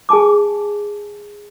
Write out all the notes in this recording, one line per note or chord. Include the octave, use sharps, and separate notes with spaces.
G#4 G#5 A5 D6